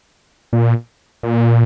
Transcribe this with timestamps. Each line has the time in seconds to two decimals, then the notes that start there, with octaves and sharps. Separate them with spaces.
0.53 A#2
1.23 A#2